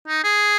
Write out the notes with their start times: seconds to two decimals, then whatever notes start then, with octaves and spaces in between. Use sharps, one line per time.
0.08 D#4
0.24 G#4